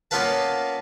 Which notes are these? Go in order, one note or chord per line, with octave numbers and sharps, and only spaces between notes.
A#3 B3 C#4 F4 B4 A5